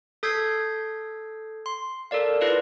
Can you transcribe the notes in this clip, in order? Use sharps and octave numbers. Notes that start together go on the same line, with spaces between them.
A4 D#6 G6 G#6 B6 C7
C6
A4 A#4 D5 F5
E4 F4 B4 D5 F5